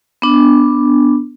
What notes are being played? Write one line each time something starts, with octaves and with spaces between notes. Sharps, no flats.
B3 D4